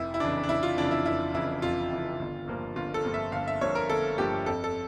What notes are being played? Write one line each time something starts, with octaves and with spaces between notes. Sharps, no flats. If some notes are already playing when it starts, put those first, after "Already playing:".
Already playing: F1 E4
E4
F2 C#3 E3 D4
D4
F1 E4
F4
F2 C#3 E3 D4
E4
F1 E4
F2 C#3 E3 E4
F1 F4
F2 C#3 E3
G1
G2 F3 A#3
G1 F4
A4
G2 F3 A#3
E5
G1 F5
E5
G2 F3 A#3 C#5
A#4
G1 A4
G2 F3 A#3 G4
F2 A4
A4